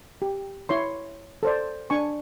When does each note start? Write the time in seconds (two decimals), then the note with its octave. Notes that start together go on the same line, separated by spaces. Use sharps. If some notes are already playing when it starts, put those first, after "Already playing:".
0.22 G4
0.69 E4 C#5 C6
1.43 A4 C5 D5
1.90 D4 G#5 C#6